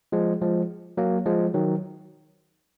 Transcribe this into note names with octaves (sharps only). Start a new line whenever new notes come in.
F3 G#3
F3 G#3
F#3 A#3
F3 G#3
D#3 F#3